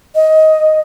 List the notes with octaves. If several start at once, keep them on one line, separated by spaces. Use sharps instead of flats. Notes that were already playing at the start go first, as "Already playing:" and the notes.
D#5